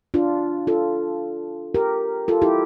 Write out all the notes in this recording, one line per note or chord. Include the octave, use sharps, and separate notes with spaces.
D4 F4
F4 A4
G4 A#4
F4 A4
E4 G4